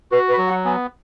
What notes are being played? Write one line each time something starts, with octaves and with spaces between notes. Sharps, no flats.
F#4 B4
B4
F#3
F#5
B3 G#5